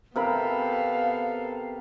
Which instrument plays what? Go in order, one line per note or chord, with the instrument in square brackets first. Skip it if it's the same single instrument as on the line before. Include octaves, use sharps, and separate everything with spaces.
[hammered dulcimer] C3 A#4 B5 [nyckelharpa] B3 A4 [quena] F5